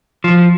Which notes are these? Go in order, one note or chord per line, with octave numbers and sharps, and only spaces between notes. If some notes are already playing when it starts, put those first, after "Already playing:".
F3